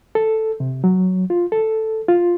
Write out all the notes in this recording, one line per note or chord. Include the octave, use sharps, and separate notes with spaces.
A4
C3
F#3
F4
A4
F4